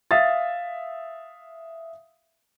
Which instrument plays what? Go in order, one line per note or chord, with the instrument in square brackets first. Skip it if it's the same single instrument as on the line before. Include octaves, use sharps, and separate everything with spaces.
[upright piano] E5 F5 D#6 A6